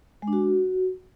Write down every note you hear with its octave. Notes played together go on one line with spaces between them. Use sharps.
G#3
D4
F#4